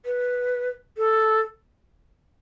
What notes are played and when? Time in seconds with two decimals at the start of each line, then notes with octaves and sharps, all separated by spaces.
0.05 B4
0.97 A4